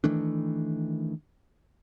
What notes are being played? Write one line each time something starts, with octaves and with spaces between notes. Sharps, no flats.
D#3 E3 A3 D4